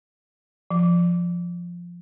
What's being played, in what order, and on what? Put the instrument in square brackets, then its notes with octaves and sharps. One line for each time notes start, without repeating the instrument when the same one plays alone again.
[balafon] F3